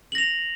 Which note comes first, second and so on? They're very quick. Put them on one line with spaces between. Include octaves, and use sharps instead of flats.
F#7 A#6 F7